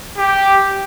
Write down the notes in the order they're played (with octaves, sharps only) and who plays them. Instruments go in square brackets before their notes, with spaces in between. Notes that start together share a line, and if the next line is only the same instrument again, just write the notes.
[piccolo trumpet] G4